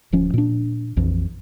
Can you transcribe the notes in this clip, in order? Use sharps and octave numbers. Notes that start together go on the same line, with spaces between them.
D1 F3 C#4
A#2 D4
A#1 F2 E3